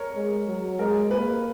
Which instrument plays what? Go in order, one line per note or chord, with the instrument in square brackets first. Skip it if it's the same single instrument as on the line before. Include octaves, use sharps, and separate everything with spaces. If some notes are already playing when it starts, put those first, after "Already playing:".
Already playing: [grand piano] A#4 C#5
[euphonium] G#3
F#3
[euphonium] G#3 [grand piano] A#4
[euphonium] A#3 [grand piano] B4